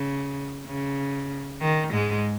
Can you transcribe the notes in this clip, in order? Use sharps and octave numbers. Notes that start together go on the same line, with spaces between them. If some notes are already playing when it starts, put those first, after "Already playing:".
Already playing: C#3
C#3
D#3
G#2 G#3